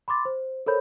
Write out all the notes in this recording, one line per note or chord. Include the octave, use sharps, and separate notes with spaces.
B5 C6 D6 A6
C5
A4 A#4 C5 C#5 B5 G6